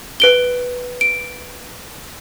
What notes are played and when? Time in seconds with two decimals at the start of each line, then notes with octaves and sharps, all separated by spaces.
0.20 B4 D7 G7
1.01 D7